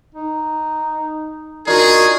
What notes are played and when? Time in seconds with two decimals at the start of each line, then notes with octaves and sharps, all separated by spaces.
0.15 D#4
1.67 D4 D#4 F4 F#4 G#4 A#4